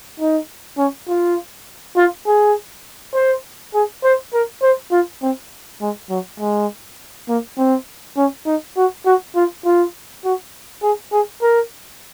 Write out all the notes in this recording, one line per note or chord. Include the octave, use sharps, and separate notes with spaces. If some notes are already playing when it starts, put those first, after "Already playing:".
D#4
C#4
F4
F4
G#4
C5
G#4
C5
A#4
C5
F4
C4
G#3
F#3
G#3
A#3
C4
C#4
D#4
F#4
F#4
F4
F4
F#4
G#4
G#4
A#4